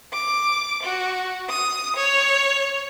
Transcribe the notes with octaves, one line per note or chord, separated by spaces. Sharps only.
D6
F#4
D#6
C#5